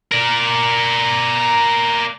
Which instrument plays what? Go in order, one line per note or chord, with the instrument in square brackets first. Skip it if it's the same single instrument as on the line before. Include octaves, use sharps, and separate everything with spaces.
[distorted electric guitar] A#4 D5